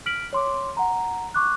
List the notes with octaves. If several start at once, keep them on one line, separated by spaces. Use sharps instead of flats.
F6 B6 D7 F#7
C#5 C6 D6
F#5 A#5
C#6 D6 F#6